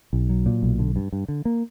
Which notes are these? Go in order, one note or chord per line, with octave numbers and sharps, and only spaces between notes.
B1
F#3
A#2
B1
D3
G2
G2
D3
A#3